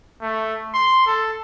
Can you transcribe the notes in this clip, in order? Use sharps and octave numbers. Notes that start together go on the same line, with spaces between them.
A3
C6
A4